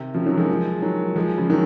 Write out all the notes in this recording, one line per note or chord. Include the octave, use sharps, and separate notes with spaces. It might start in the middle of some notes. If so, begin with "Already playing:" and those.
Already playing: C3 D#3
C#3 F3
D#3 F#3
F3 G#3
D#3 F#3
F3 G#3
C#3 F3
D#3 F#3